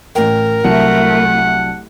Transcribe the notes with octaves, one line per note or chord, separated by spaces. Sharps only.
A1 A#4 G5
C2 F#3 A3 E4 F#5 A5